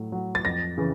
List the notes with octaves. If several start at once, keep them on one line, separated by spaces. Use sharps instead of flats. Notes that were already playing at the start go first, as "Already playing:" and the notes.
Already playing: A2 F#3
F#3
A6
F2 A#6
C#3 E3